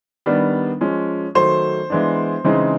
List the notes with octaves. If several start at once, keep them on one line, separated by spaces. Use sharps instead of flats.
D#3 G3 B3 D4
F3 G#3 C#4
D#3 F#3 A3 C5
E3 G#3 B3 D4
C#3 E3 G#3 C4 D#4